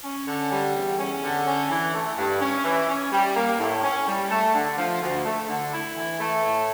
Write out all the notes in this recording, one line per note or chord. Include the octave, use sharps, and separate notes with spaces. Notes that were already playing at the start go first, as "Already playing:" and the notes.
C#4
D3
G3
E2
C#4
D3
C#4
E3
A3
G2
C#4
E3
C#4
G3
A#3
A2
C#4
G3
A3
D3
F3
D2
A3
D3
E4
E3
A3
A2